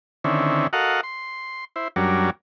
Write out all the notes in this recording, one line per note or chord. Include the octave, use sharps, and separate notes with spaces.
D3 D#3 C4 C#4 E4
F#4 A4 A#4 D#5 F5 F#5
C6
E4 C5
F#2 F#3 G3 C#4 D4 A#4